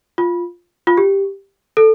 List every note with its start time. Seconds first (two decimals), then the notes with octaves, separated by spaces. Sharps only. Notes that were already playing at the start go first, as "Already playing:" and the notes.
0.18 F4
0.87 F4
0.97 G4
1.77 A4